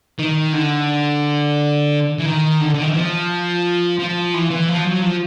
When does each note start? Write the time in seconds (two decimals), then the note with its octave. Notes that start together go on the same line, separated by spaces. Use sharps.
0.19 D#3
0.53 D3
2.19 E3
2.26 D#3
2.61 D3
2.74 D3
2.82 D#3
2.89 E3
2.96 F3
3.99 F3
4.34 E3
4.51 E3
4.68 F3
4.86 F#3
5.02 F3